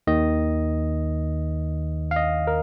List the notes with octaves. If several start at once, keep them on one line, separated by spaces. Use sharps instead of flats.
D#2 D#3 D#5
F5
D#5
A#4